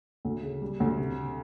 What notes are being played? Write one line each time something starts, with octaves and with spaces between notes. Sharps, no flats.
D2
C#3
G3
D2
C3
C3